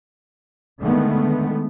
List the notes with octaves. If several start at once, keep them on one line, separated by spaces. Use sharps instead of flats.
D3 D#3 G#3 A3 B3